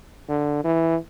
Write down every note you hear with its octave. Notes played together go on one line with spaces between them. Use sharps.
D3
E3